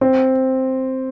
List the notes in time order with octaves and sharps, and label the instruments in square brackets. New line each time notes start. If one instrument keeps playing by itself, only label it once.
[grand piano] C4